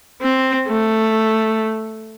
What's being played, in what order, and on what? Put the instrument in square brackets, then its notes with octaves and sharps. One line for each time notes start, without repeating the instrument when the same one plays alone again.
[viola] C4
A3